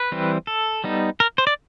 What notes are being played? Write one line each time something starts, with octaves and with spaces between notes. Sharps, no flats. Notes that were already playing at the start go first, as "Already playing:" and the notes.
Already playing: B4
E3 G3 C4
A4
G3 B3 D#4
A#4
C5
D5